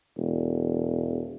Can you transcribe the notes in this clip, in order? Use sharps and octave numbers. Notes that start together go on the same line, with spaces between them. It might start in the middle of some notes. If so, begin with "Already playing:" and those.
E1